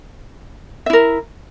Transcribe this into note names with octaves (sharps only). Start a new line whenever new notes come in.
E4 A#4 E5